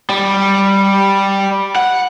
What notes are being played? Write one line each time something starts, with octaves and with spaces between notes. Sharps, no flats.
G3
F#5